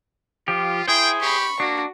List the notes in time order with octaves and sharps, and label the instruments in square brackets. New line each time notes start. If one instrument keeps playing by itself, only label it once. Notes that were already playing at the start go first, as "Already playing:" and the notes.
[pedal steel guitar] F3 G4 [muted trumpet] F4
[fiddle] E4 [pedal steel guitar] G#4 C5 [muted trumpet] G5
[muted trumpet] G4 [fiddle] B5 C#6
[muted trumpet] A#3 [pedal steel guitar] D4 [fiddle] F#4